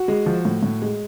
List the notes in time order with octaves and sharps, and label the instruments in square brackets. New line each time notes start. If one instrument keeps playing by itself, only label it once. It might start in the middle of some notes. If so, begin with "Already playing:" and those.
Already playing: [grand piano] F#4
G#3
F3
A2
A2
G#3